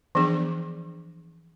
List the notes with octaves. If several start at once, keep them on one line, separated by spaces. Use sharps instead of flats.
E3 F3 B3 D4 G#4